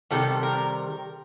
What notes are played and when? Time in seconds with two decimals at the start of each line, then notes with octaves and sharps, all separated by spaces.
0.11 C3 D#3 G3 A4
0.43 A#4